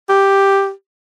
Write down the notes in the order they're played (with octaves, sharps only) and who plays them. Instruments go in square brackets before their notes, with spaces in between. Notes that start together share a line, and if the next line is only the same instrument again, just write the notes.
[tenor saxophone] G4